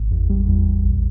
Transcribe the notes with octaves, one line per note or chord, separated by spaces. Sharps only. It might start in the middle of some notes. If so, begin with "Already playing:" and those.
Already playing: G#1
E2
G3
E2
E2
A#1